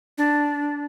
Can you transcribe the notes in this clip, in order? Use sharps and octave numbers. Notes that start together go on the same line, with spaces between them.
D4